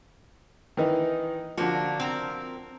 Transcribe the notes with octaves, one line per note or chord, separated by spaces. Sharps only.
D#3 E3 D#4
D3 F3 A#3 D4 F#4
C4 A#4